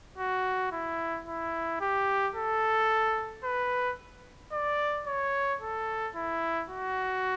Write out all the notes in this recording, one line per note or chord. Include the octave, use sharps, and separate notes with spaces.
F#4
E4
E4
G4
A4
B4
D5
C#5
A4
E4
F#4